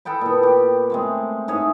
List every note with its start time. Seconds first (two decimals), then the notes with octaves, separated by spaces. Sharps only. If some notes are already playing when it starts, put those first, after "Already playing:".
0.05 A4 F#5 G5 B5
0.21 A#2 B3
0.43 G4
0.90 G#3 A3 C4
1.48 G#2 G#4 C#5 E5